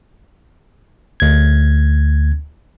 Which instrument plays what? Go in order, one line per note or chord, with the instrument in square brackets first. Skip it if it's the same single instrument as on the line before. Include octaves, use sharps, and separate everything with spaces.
[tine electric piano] D2 G#6